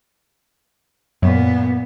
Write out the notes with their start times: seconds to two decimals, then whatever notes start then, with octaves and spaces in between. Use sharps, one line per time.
1.22 F#2 A#2 B3